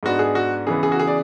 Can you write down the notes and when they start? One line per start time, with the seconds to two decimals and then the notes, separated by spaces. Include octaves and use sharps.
0.03 G#2 G#3 B3 D4 F#4
0.19 G#4
0.35 F#4
0.67 C#3 E3 B3 G#4
0.83 G#4
0.92 F#4
0.99 G#4
1.07 D5